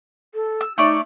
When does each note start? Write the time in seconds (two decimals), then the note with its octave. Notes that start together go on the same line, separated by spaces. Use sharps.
0.34 A4
0.61 E6
0.78 A3 D#4 C#5 D5